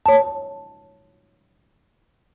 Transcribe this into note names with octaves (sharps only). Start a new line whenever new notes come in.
C#5 A5